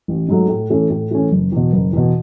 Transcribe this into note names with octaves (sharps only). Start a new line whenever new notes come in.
A1
G#2 F#3 A3
A2
E3 A3 C#4
A2
E3 A3 C#4
F#1
E2 B2
F#1
E2 B2